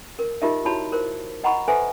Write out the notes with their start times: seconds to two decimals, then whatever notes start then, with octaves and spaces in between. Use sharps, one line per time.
0.19 A#4
0.42 D#4 F4 G4 A#4 D#5 E5
0.65 E4 F#4 C#5 A5 B5
0.92 A#4 C5
1.44 D#5 F#5 A#5 B5 C#6
1.68 A4 B4 C5 E5 G#5